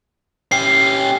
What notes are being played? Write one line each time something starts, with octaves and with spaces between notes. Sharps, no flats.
C#4 G4 C7